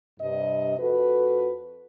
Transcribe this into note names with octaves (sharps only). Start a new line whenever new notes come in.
G2 C3 D#5
F2 F#4 A4 B4